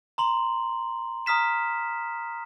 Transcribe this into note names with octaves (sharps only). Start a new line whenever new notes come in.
A#5 C6 F#7
A#5 D#6 F6 B6 E7